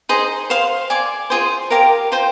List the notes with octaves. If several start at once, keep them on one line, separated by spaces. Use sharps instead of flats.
D#4 G#4 C5 D#5
C5 F5 C6
D5 G#5 D6
F4 G#4 C5
G4 A#4 F5 A#5
F4 C5 G5